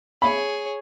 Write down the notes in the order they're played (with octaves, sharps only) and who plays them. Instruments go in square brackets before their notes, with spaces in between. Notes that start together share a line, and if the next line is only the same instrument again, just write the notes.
[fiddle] G#4 C#5 [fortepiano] B5